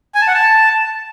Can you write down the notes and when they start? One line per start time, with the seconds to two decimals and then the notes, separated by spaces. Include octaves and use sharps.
0.15 G#5
0.21 A5
0.28 F#5
0.34 A5